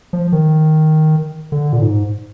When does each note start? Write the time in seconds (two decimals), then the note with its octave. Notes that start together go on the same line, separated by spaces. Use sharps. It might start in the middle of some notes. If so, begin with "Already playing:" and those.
0.13 F3
0.32 D#3
1.52 D3
1.73 A#2
1.82 G#2